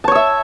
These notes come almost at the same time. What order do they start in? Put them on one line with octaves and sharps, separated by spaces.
A5 C#5 E6 E5